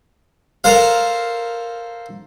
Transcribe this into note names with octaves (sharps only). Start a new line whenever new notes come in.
A4 A#4 C5 F5